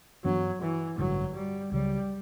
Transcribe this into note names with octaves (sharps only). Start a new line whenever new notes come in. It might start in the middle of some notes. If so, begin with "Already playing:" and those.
G2 E3 F#3 B3 D4
E3
A1 G2 D3 F#3
G3
C#2 C#3 F#3 G3